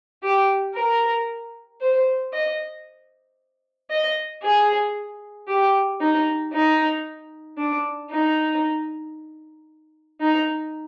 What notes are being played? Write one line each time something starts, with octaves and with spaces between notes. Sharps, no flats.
G4
A#4
C5
D#5
D#5
G#4
G4
D#4
D#4
D4
D#4
D#4